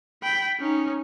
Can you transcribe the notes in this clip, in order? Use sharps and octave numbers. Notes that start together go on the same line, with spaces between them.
G5 B5
C#4 D#4